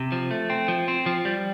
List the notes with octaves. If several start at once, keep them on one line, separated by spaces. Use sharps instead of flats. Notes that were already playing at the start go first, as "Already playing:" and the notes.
Already playing: C3
F3
A3
C4
F3
C4
F3
G3